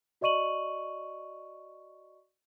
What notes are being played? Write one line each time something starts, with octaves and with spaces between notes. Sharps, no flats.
F#4 D5 D#5 C#6 D#7 F#7